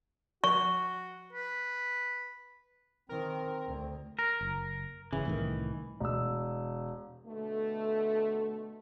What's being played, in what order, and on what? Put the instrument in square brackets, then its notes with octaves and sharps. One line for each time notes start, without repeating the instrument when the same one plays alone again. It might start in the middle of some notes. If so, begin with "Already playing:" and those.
[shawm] F#4 [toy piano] C#6
[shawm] B4
[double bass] D#3 [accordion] C4 [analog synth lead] A#4
[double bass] D2
[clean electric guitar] A#4
[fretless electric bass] F#1
[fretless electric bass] G1 C#3 [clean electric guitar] E3
[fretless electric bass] C2 A2 D#3
[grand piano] E1 E6
[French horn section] B2 D3 A3